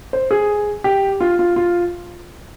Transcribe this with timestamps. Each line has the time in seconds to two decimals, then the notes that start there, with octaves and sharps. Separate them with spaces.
0.13 C5
0.31 G#4
0.84 G4
1.20 F4
1.39 F4
1.56 F4